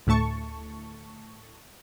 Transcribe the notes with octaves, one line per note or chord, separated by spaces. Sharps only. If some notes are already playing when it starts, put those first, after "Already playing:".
D2 A2 A3 A5 C#6